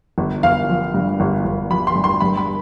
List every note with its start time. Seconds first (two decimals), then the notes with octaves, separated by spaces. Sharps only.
0.18 G1
0.43 G1 F5
0.69 F3
0.94 G2
1.20 G1
1.45 G1
1.70 F3 B5
1.87 C6
1.95 G2
2.04 C6
2.20 G2 B5
2.37 B5